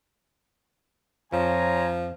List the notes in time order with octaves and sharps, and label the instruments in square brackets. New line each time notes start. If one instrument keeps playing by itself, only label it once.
[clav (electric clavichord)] F2 [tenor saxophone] F3 [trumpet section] C5 G#5 A#5 [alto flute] C#5